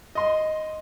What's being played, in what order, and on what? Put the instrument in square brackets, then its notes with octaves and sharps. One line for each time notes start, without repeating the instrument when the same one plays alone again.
[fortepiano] D#5 C6